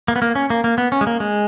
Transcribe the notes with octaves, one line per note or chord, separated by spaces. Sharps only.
A#3
B3
A#3
C#4
A#3
A#3
B3
C#4
G#3
A#3
G#3